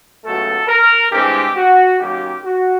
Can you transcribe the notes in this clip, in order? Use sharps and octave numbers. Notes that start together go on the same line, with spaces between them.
C#2 B2 F#3 A3 A4
A#4
G2 E3 G#3 C4 G4
F#4
F#2 D#3 F#3 A#3 G4
F#4